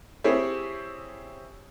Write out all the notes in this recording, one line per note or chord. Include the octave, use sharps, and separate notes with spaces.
C4 E4 G4 G#4 C#5